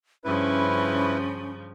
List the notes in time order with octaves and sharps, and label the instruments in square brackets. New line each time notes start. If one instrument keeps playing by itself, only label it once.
[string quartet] G2 C#3 F3 [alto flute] C#4 [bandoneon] E4 B4